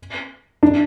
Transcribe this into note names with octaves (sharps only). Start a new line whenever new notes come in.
D4